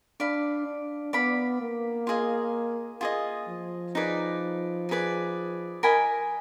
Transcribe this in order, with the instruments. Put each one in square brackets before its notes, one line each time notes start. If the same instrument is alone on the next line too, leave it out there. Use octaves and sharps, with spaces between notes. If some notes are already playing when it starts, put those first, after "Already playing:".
[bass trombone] D4 [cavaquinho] D5 F5 B5
[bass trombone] D4
[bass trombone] B3 [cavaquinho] D5 F5 B5
[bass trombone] A#3
[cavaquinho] F4 G#4 D#5
F4 G#4 D#5
[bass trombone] F3
[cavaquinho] D#4 G#4 B4 D5
D#4 G#4 B4 D5
A#4 D#5 G#5 B5